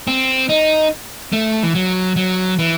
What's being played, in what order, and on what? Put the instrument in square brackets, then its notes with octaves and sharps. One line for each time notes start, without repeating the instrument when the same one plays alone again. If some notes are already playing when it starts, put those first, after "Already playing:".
[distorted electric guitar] C4
D#4
A3
E3
F#3
F#3
E3